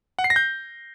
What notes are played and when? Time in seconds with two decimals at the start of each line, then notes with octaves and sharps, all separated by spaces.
0.19 F#5
0.24 C7
0.30 A#6
0.36 G6